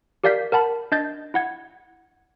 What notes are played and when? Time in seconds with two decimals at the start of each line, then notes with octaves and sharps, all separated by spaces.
0.24 G4 A#4 D5 F5 G6 B6
0.52 A#4 F#5 A5 B5
0.92 D4 D#5 G6 A6
1.34 E4 F#5 G#6